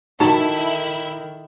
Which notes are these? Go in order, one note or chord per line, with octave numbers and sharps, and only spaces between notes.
D#3 D#4 E4 F#4 A4 A5